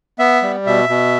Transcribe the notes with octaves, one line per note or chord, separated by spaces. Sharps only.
B3 E5
G3
B2 E5
B2